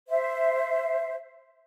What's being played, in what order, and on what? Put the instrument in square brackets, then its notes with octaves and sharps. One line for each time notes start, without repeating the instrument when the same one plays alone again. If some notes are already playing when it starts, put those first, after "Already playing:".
[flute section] C5 E5